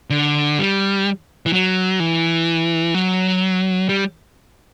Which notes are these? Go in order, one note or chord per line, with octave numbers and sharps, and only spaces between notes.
D3
G3
E3
F#3
E3
F#3
G3